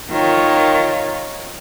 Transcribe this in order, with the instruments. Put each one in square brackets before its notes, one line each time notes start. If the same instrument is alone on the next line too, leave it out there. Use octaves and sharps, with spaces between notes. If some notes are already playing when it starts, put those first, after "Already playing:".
[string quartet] D#3 F4 A#4 C#5